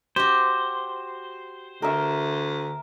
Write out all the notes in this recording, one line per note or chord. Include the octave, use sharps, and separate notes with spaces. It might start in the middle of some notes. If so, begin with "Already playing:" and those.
F#4 G4 C5
D2 A#4 E5